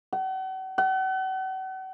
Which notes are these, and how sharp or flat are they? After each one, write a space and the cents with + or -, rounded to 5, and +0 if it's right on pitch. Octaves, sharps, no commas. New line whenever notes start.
F#5 +40
F#5 +40